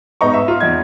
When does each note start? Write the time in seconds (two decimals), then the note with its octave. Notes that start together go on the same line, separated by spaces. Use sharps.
0.21 G#2 B3 D#4 A#5 C#6
0.34 E5
0.48 F4
0.60 E2 D#4 G#6